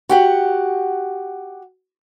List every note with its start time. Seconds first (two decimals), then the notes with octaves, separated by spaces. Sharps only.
0.09 F#4 G4 F#5